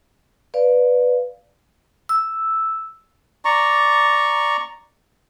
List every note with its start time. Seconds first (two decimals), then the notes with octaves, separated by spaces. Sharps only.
0.54 B4 D5 F5
2.09 E6
3.45 D5 A#5 C#6